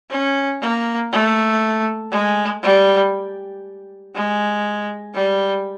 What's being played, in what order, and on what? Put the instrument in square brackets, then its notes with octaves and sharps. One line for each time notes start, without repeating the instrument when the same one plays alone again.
[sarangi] C#4
A#3
A3
G#3
G3
G#3
G3